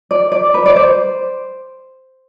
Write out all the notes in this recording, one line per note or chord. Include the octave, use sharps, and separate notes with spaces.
D5
D5
B4
D5
C5